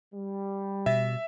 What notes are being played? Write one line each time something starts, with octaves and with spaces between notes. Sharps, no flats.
G3
B2 E5